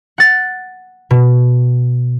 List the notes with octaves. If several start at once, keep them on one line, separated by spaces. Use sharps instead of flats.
F#5 A6
B2